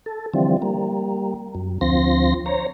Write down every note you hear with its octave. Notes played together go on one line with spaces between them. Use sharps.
A4
D3 E3 F3 G3 C4
G3 A#3
F#2
D2 F3 C4 C6 A#6
C5 C#5 A#5